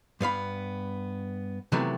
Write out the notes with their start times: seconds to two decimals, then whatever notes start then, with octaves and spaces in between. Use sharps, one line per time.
0.21 G2 B3 F5 B5
1.72 C3 D#3 E3 F#3 A3 B3